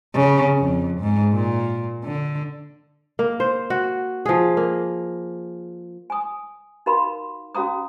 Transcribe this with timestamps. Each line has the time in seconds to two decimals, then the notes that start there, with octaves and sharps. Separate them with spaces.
0.15 C#3
0.59 F2
1.00 G#2
1.34 A#2
2.04 D3
3.19 A#3
3.40 C5
3.70 F#4
4.26 F3 G#4
4.57 A#3
6.10 G#5 D#6
6.86 D#4 F#4 A#4 F5 B5 C6
7.55 C#4 F#4 F5 A#5 D#6